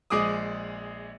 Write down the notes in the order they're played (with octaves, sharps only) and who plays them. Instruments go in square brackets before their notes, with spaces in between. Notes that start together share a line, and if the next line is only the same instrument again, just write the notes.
[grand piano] A#1 G#3 G#4 D6 D#6